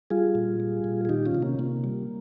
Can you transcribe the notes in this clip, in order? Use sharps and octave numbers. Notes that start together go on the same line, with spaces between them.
G3 F4 G#4
A#2
G3
A#2
G#4
D#3 D#4 G4
C#4 F4
C3
A#3 C#4
C3 A#3
G3